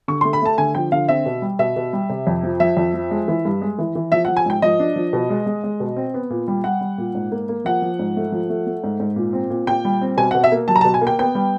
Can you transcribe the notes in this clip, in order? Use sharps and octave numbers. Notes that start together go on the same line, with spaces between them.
D3 C#6
A3 C6
B5
A3 A5
D3 G#5
F3 G5
D3 F5
C4 E5
B2
G3
B2 E5
B2
G3
C3
F2
F3
F3 E5
F2
F3
G#3
E3
G2
G#3
E3
E3
F3 E5
F3 F#5
G#5
G#2 G5
F3 D#5
D4
F3
B2
G#3
G#3
G#3
B2
C4
B3
A#2
G3
G3 F#5
G3
A#2
G#2
A#3
A#3
F3 F#5
F3
G#2
A3
F3
A3
A3
G#2
G#2
A#2
C4
A#2
A#2 G5
G3
C4
B2 G#5
B2 F#5
E5
A#3
F#3 A5
A#5
B2 A5
G#5
A#3
G5
B3 G5
G3